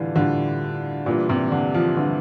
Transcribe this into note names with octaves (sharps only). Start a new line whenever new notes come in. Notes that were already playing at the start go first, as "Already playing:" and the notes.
Already playing: A2 D3 E3 G3 D4 F4
A2 D3 G3 D4 F4
A#2 E3 G3 D4 F4
C3
D3
F3
D3 E3 G3 D4 F4